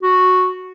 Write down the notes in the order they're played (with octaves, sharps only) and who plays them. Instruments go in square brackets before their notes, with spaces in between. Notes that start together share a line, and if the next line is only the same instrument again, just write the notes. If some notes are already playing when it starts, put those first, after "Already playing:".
[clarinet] F#4